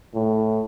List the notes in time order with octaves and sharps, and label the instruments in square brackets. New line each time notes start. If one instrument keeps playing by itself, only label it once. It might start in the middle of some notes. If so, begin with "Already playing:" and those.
[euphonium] A2